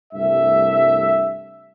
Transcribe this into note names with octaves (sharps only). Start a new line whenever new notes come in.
C2 G2 A3 E5